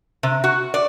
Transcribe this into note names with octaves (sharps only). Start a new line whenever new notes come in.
C3
F#4
D5